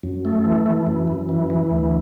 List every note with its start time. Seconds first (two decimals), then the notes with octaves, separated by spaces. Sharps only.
0.03 F#2
0.25 A3
0.45 E3
0.66 E3
0.87 F#2
1.07 F#2
1.29 E3
1.50 E3
1.71 D2